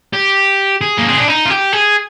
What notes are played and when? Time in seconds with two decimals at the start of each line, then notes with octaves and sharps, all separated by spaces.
0.13 G4
0.81 G#4
0.98 A#3
1.08 C4
1.18 D4
1.28 D#4
1.45 F4
1.50 G4
1.72 G#4